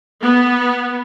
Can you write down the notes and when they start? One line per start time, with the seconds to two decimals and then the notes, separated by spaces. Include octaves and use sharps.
0.23 B3